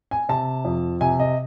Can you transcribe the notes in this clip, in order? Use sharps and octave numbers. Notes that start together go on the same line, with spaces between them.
G#5
C3 A5
F2
C3 G#5
D#5